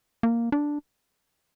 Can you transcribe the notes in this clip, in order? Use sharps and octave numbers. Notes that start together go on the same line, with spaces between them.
A#3
D4